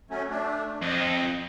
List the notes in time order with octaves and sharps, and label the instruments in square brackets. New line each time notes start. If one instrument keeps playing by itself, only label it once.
[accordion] F#3 A3 C#4
A3 D4
[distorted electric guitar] F2 [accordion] D#5